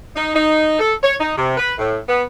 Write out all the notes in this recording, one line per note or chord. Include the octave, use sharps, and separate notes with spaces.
D#4
D#4
A4
C#5
D#4
C3
B4
A2
B3